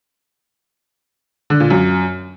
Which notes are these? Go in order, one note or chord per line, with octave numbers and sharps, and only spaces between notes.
D3
A#2
F#2